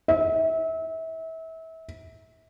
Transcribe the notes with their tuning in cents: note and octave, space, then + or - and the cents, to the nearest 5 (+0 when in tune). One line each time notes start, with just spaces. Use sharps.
E5 -30